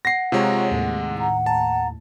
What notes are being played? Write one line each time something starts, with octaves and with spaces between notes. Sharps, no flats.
F#5 A#6 C7
C3 G#3 F4 C#5 A#5
D#2 A2
F#5 A#5
A5 A#5